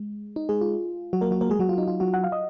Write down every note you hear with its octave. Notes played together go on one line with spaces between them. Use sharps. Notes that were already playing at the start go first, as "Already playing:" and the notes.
Already playing: G#3
D#4
G#3 G#4
F4
F#3 F#4
A#3 A#4
F#3 F#4
A#3 A#4
G#3 G#4
F#3 F#4
F4
D#4
F4
F#3 F#4
F#5
F5
D#5